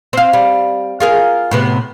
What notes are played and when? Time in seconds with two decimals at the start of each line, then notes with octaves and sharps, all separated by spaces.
0.13 C4 F5
0.33 G3
1.00 F4 G#4 A#4
1.51 A2 C3 B3